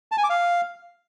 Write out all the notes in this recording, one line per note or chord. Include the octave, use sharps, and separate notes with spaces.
A5
G#5
D6
F5